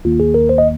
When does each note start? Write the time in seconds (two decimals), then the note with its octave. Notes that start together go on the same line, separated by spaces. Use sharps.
0.05 D#2 D#3 A#3 F4
0.20 G#4
0.34 A#4
0.49 C5
0.58 D#5